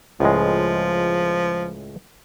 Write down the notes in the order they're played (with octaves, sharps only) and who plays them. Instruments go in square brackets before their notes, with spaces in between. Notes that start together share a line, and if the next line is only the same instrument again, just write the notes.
[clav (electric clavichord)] C#2 A2 G#3 [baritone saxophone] F3